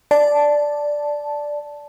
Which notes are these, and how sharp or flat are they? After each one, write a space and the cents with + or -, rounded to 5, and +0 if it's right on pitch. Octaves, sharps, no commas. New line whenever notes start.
D5 +0 A5 -5